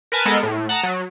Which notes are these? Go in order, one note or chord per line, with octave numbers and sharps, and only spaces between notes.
A#4 B4 G#5 A5
G#3 B3 A4 A#4
A2
F#5 A5 A#5 D#6
F#3